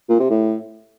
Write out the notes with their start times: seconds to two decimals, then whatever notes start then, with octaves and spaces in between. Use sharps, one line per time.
0.09 A#2
0.20 C3
0.30 A2